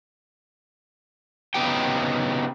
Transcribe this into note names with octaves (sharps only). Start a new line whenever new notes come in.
C#3 F#3 B3 D#4 G4 G5